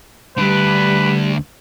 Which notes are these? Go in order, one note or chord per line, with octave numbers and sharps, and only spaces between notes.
D2 G3 D4 B4